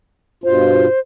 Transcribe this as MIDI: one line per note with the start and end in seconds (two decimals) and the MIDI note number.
0.44 0.87 43
0.44 0.87 47
0.44 0.87 65
0.44 1.00 72